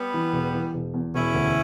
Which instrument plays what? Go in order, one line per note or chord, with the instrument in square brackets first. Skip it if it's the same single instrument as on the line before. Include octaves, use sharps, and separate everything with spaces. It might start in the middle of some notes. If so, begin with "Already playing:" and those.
Already playing: [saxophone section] G3 B3
[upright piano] E3
E1
E3
E1
E2
[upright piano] E1 [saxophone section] C#4 E4
[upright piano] D2